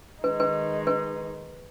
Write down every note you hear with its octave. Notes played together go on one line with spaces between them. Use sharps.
D#3 G#3 D#4 B4
B4
B4